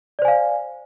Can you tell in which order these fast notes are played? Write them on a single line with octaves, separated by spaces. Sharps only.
D5 C5 G#5 F5